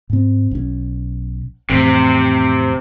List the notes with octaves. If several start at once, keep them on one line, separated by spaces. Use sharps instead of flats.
G#2 C4
B1 C#4
A1 F2 C3